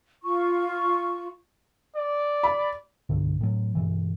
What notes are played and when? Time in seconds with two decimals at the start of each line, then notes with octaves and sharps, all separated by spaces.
0.23 F4 C#6
1.96 D5
2.43 B5
3.09 C2 G2 B2 D3
3.41 A2 F#3
3.75 G2 B2 E3